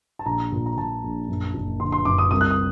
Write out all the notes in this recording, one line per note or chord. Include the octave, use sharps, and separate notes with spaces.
A5
A#1 A#5
A#2
A#5
A#2 A5
A#1
F#2
F#1
D3 C6
C6
F#2 D6
D#6
C2 D#6
F#6
D#6